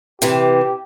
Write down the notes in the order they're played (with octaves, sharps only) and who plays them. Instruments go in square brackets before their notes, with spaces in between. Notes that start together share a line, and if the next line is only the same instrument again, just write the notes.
[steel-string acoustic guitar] C3 E3 [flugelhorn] G4